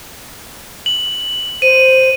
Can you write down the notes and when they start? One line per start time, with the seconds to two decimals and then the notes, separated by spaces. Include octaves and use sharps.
0.86 F#7
1.62 C5 D#7